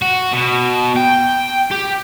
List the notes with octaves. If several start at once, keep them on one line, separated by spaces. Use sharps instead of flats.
F#4
B2
G5
G4